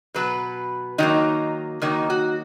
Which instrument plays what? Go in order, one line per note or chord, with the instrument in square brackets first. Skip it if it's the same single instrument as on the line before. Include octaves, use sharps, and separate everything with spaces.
[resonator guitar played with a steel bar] B2 F#3 B3 B4
D#3 F#3 A#3 D#4
D#3 F#3 A#3 D#4
F#4